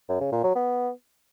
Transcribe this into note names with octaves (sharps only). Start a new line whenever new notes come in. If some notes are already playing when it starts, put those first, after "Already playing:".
F#2
C#3
A#2
F#3
B3